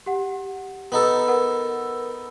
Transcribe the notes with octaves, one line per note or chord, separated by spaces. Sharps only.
G4 F#5
B3 D#4 A4
A#4 B4 F#5